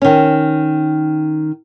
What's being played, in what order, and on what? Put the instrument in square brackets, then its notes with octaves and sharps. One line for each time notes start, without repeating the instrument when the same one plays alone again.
[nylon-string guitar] D#3 C#4